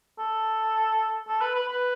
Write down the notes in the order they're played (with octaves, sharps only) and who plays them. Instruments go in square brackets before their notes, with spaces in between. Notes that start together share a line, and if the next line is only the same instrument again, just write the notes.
[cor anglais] A4
A4
B4
B4
B4